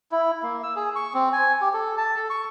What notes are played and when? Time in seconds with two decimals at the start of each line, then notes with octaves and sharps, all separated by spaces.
0.12 E4
0.43 A#3
0.63 E6
0.76 G#4
0.95 C#6
1.14 C4
1.33 G#5
1.61 G4
1.73 A4
1.97 A5
2.16 A4
2.30 C#6